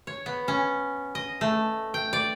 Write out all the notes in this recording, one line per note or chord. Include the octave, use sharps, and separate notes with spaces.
C#5
B3
C#4
D#5
A3
G5
D5